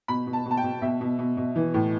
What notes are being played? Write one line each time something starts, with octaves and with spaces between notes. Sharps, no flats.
B2 B5
B2
A5
B2
A5
G5
B2
B2 E5
B2
B2
B2
E3
A2